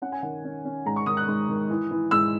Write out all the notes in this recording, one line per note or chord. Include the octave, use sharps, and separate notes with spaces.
C#4 F#5
G#5
D#3 F#5
C#4
C#4
G#2 A#5
C#6
D#3 D#6
F#6
G#2
D#3
E3
E3
G#2 E6